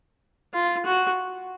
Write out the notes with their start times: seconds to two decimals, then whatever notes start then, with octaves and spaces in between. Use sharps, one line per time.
0.54 F4
0.85 F#4